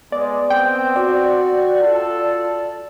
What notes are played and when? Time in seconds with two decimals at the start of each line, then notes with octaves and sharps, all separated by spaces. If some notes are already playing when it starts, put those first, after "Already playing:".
0.12 G#3 B3 D5
0.50 C4 G5
0.96 F#4 D5
1.82 F4 A4